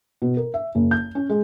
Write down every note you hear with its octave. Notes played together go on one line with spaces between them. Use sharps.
B2
A#4
E5
F#1
G6
C#4
G#3